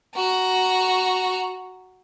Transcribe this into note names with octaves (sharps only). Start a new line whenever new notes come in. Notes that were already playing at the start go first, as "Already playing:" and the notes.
F#4 A#5